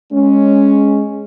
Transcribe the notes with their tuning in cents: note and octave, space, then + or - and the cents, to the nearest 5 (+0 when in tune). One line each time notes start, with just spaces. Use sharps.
G#3 +0 C#4 +0